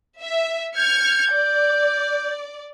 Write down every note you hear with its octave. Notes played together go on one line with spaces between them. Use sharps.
E5
F6 G6 G#6 C#7
D5